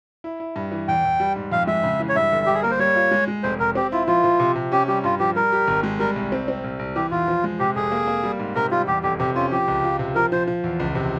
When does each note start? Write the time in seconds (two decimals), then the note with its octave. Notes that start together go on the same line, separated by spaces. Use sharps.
0.24 E4
0.40 E4
0.56 G2
0.72 E3
0.88 E2 G5
1.04 E2
1.20 G3
1.36 G#2
1.52 F2 F5
1.67 G#3 E5
1.84 C#3
2.00 E3
2.09 C#5
2.16 G2 E5
2.32 G1
2.46 G2 G4
2.54 G#4
2.62 A#3 A#4
2.71 C5
2.79 G3 C#5
2.96 F4
3.11 G#3
3.28 G#3
3.43 F1 C5
3.59 F1 A#4
3.75 C4 G4
3.92 E4 F4
4.07 F3 F4
4.24 F3
4.40 C3
4.56 C3
4.72 C#4 G4
4.88 G3 G4
5.04 G2 F4
5.20 F3 G4
5.36 G3 A#4
5.52 G4
5.67 G#1
5.83 G#3
5.99 G3 A#4
6.16 C2
6.32 C4
6.48 C4
6.64 C2
6.79 C2
6.95 E3 G4
7.11 E2 F4
7.28 F3
7.44 G#3
7.59 C3 G4
7.76 F1 G#4
7.92 A#3
8.07 A#3
8.23 G3
8.40 G#2
8.55 C3 A#4
8.71 G3 F4
8.87 E2 G4
9.03 F1 G4
9.20 C3 G4
9.35 C#4 F4
9.52 F3 G4
9.68 C#2
9.84 F4
9.99 C3
10.15 F3 A#4
10.32 F3 C5
10.47 F3
10.64 E2
10.80 C#2
10.95 C3